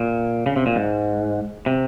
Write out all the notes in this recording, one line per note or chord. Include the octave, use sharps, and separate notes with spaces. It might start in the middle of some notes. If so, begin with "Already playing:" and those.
Already playing: A#2
C#3
C3
A#2
G#2
C3